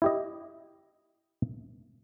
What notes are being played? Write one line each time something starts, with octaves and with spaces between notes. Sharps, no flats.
E4 G4 D#5